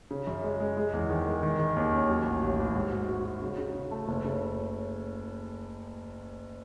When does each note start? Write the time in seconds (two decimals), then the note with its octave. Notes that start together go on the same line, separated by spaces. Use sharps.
0.11 C#3
0.27 F#2
0.44 G#3
0.60 G#3
0.77 G#3
0.93 E2
1.10 D#3
1.27 G#3
1.43 D#3
1.59 D#3
1.76 D#2
1.93 C#4
2.09 F#3
2.26 A1
2.42 A1
2.59 A1
2.75 G#2
2.92 F#4
3.09 F#4
3.25 F#4
3.42 C#3
3.58 C#3
3.75 C#3
3.91 A3
4.08 F#1
4.25 C#3